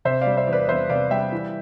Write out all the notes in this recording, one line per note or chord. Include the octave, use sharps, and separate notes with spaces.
C3 C5 E5
D5 F5
G3
C5 E5
E2
B4 D5
E2 C5 E5
C3 D5 F5
G3 E5 G5
E3